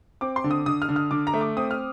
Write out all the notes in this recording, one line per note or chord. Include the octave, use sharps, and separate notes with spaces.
C4 D6
C6
D3
D#6
D3 D#6
F6
D3
F6
D3 D6
A#5
A3
D6
C4 D#6
F6